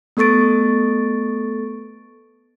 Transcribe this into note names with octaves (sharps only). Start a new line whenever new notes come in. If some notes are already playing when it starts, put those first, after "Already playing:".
A3 B3 A4 C#6 A6 D7